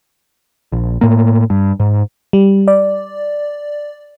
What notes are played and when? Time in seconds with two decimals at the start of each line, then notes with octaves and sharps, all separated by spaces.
0.72 A#1
1.01 A2 A#3
1.50 G2
1.80 G#2
2.33 G3
2.68 D5